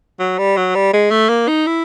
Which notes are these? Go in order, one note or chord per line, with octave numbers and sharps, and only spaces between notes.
F#3
G3
F#3
G3
G#3
A3
A#3
D#4
E4